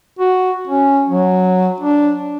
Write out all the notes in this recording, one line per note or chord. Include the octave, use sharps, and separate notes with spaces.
F#4
C#4
F#3
D4